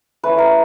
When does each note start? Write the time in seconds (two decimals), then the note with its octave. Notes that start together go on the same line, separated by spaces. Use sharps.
0.24 A3 C#4 E4 B4
0.38 A#4